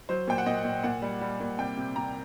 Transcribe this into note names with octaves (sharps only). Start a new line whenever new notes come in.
F#3 C5
A#2 G5
F#5
A#2 D#5
A#2
A#2 F#5
G3
G3
A#2
C3 G5
C3
C3 A#5